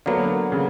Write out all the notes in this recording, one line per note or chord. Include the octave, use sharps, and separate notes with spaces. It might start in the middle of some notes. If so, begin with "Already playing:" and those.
D3 F#3 A#3 B3
C#3